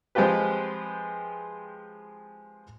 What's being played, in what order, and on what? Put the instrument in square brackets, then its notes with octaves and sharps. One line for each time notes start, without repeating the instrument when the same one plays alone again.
[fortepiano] F3 G#3 C4 F4 G4 B4